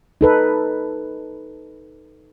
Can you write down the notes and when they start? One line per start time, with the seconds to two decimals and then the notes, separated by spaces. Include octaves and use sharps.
0.21 D#4 A4 B4